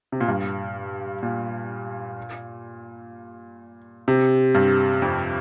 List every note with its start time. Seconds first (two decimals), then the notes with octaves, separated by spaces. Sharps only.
0.12 C3
0.21 A#2
0.28 G2
1.23 A#2
4.08 C3
4.55 G2
5.02 F2